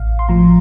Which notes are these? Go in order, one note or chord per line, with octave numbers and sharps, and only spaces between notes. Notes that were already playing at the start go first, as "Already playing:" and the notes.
Already playing: A1 F5
C6
A2 F3 A#5